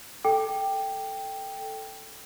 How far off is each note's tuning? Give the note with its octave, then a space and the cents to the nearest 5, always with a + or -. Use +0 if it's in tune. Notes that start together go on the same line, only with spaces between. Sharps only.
A4 +0 G5 +0